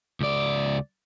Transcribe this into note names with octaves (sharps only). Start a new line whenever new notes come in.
C#2 D5